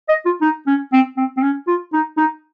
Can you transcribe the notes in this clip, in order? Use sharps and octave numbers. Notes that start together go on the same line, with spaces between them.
D#5
F4
D#4
C#4
C4
C4
C4
C#4
F4
D#4
D#4